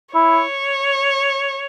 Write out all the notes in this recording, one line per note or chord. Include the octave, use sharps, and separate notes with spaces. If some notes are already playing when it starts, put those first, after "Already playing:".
E4 C#5